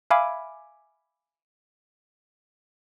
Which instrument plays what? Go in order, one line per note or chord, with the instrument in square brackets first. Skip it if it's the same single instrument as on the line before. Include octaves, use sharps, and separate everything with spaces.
[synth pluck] E5 F5 G#5 B5 D6